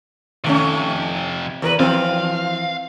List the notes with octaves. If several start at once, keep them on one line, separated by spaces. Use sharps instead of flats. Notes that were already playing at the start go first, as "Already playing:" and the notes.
F2 C3 D#3 A3 C#4
E2 A#4 B4
E3 F3 C4 F5